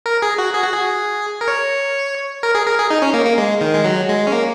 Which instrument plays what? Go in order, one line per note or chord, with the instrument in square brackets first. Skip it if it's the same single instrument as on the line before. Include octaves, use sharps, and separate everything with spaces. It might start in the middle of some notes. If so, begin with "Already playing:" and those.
[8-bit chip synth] A#4
G#4
F#4
G#4
F#4
G#4
A#4
C#5
A#4
G#4
A#4
G#4
D#4
C#4
A#3
A#3
G#3
D#3
G#3
F#3
G#3
C#4
A#3